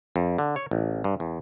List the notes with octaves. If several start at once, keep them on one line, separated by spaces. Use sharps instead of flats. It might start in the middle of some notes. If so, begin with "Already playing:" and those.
F2
D3
C#5
A1
G2
E2